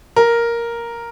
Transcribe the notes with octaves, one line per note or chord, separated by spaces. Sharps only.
A#4